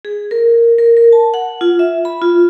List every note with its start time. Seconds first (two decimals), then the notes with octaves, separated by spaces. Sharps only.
0.05 G#4
0.31 A#4
0.79 A#4
0.97 A#4
1.12 A5
1.34 F#5
1.61 F4
1.79 E5
2.05 B5
2.22 F4